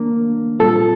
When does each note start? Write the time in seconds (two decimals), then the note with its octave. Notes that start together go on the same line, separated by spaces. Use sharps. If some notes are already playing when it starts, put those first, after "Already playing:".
Already playing: D#3 G3 A#3 D4
0.60 A#2 G3 C4 F4 A4